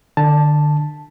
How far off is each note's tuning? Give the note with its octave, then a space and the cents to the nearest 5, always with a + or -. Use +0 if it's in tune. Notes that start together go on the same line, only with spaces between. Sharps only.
D3 +25 A5 +0